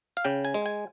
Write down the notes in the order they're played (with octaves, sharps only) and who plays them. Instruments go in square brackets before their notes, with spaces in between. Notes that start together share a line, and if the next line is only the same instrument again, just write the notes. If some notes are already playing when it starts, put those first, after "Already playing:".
[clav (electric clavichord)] F5
C#3 G5
G#5
G#3
G#5